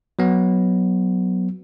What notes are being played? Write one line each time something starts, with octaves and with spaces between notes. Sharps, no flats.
F#3 B3